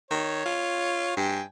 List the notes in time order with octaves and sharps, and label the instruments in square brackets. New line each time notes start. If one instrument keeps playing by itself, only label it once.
[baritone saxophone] D#3 [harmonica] C#5
[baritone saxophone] F4
[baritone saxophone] G2 [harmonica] G5 G#5